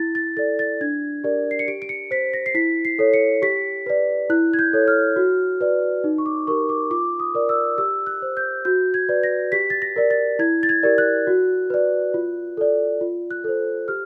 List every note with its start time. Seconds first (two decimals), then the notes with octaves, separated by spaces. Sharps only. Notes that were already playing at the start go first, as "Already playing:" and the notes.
Already playing: E4 A6
0.15 A6
0.37 A4 D5 A6
0.59 A6
0.81 D4 G#6
1.24 G4 A#4 D5
1.51 C7
1.59 C#7
1.67 G4 D7
1.82 D7
1.89 C#7
2.11 C5 B6
2.34 A#6
2.46 C7
2.55 E4 B6
2.85 C7
2.99 A4 C#5
3.13 C#7
3.42 G4 B6
3.86 B4 D5
4.30 E4 F#6
4.53 G#6
4.59 G6
4.73 A4 C#5
4.88 F6
5.16 F#4
5.61 B4 D5
6.04 D#4
6.18 C#6
6.26 D6
6.47 G4 A#4 C#6
6.69 D6
6.91 F4 D6
7.20 D#6
7.35 A#4 D5
7.49 E6
7.78 G4 E6
8.07 F#6
8.22 C5
8.37 G6
8.65 F#4 G6
8.94 G#6
9.09 B4 D5
9.23 A#6
9.52 G4 B6
9.70 A6
9.82 A#6
9.96 A#4 D5
10.11 A6
10.39 E4 G#6
10.63 A6
10.69 G#6
10.83 G4 A#4 D5
10.98 F#6
11.27 F#4
11.70 B4 D5
12.14 F4
12.57 A4 D5
13.01 F4
13.31 F#6
13.44 A4 C5
13.88 G4 F6